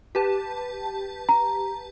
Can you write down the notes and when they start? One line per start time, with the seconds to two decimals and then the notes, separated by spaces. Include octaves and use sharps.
0.15 G4 B4 A5
1.29 A#5